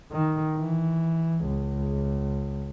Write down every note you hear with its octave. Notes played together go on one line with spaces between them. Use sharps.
D#3
E3
C#2